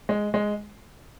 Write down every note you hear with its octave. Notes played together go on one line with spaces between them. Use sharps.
G#3
G#3